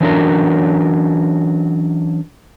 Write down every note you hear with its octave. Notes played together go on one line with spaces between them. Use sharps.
E3 F#3 C#4 D4 A4 A#4